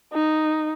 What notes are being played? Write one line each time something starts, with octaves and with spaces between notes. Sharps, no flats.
D#4